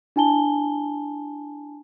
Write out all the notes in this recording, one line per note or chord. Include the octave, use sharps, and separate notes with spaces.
D4 E4 G#5 A5 G7